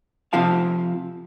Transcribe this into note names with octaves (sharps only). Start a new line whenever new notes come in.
C3 F3 F4 F5 A5